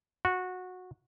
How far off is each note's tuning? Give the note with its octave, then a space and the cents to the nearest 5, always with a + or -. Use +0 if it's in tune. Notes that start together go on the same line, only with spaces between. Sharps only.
F#4 -15